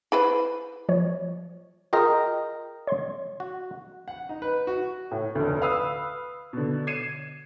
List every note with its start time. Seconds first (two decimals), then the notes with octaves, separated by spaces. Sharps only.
0.12 E4 B4 C5
0.89 F3 C#5
1.93 F4 G#4 A#4 D#5 G5 E6
2.87 C#5 C6
3.40 F#4
4.08 F#5
4.29 D#4
4.42 B4
4.67 F#4
5.11 A2
5.35 F1 D2
5.61 B4 F5 B5 D#6 E6
6.53 B2 D3
6.87 G#6 C7 C#7 D#7 E7